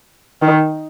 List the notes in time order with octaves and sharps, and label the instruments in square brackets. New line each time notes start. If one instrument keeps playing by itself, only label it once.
[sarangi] D#3